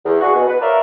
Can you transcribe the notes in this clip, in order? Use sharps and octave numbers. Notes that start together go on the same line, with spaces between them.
E2
E2 D4 F#4 G#4 F#5 C#6
B2
B4
A#4 C#5 D5 E5 F5 A5